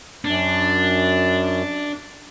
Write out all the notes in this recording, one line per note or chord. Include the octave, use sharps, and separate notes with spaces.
F#2 D4